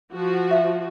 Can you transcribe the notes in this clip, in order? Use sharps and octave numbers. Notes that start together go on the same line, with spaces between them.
F3 F#4
E5 F5